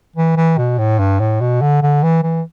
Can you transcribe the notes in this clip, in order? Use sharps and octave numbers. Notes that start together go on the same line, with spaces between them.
E3
E3
B2
A2
G2
A2
B2
D3
D3
E3
E3